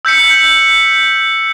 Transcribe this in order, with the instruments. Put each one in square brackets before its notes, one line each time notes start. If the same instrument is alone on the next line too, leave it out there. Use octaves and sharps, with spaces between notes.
[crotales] E6 G6 B6 C#7